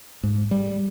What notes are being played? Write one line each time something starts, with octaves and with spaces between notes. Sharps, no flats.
G#2
G3